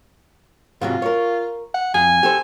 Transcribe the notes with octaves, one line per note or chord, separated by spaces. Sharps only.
G#2 C3 F#3 F4
A#4 C#5
F#5
F2 G#5
G4 A4 C5